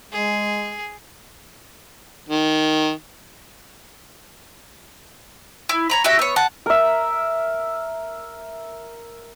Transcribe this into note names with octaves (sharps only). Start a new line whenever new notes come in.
G#3 G#4
D#3
E4
C#5 A#5 B5
F#4 G4 E5
B3 C#5
F#5 A5
A#4 E5